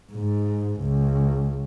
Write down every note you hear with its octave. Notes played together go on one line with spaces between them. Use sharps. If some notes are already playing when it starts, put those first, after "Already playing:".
G#2
C#2